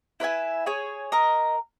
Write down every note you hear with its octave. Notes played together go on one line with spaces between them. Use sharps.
E4 B4 E5 G#5
G#4 C#5 G#5
A#4 D#5